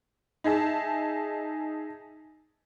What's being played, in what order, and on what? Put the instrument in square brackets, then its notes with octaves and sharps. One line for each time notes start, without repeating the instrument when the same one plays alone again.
[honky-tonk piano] D#4 G#4 E5 A5